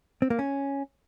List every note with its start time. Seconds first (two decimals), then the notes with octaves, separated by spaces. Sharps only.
0.22 C4
0.30 A#3
0.39 C#4